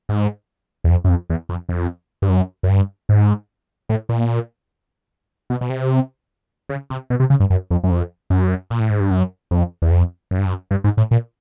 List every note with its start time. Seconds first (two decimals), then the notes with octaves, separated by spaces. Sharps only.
0.09 G#2
0.84 E2
0.90 F2
1.04 F#2
1.09 F2
1.30 E2
1.49 F2
1.69 F2
2.22 G2
2.29 F#2
2.63 F#2
2.69 G2
3.09 G#2
3.89 A2
4.09 A#2
5.50 B2
5.61 B2
5.70 C3
6.69 C#3
6.90 C3
7.10 B2
7.20 C3
7.30 C#3
7.40 G2
7.50 F#2
7.71 F2
7.84 F#2
7.90 F2
8.30 F#2
8.70 A#2
8.80 A2
8.90 G#2
9.00 G2
9.11 F#2
9.51 F2
9.82 E2
9.91 F2
10.31 F#2
10.38 G2
10.46 F#2
10.71 G2
10.84 G#2
10.97 A2
11.11 A#2